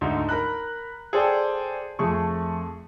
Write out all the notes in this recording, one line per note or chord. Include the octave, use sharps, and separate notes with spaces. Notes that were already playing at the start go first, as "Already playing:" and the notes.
D2 G#2 D#4
A#4 A#5 B5 F#6
G#4 A4 C5 D5 G5 G#5
F2 A3 G#4 C#6